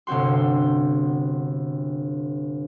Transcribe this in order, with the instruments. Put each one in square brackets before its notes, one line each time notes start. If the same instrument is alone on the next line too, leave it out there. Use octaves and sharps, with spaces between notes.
[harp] G1 C3 C4 F#4 C6